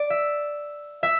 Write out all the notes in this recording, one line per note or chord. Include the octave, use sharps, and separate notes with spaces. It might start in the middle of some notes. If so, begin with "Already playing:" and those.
Already playing: D5
E5
E5